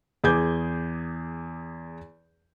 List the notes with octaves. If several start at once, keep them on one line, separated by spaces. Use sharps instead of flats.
E2 G#4 D6 G6 G#6